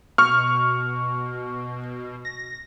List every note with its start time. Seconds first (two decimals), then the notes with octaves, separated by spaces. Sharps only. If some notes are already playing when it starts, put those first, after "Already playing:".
0.18 B2 C#6 F6
2.25 A#6